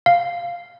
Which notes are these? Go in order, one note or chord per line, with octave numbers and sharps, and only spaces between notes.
F5